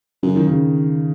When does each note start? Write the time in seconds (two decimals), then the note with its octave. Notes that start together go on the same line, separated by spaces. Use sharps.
0.23 F#2 C#3
0.36 D#3
0.47 C#3